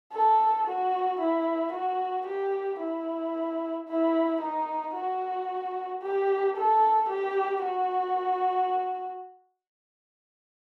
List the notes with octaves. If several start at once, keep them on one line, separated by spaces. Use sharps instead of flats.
A4
F#4
E4
F#4
G4
E4
E4
D#4
F#4
G4
A4
G4
F#4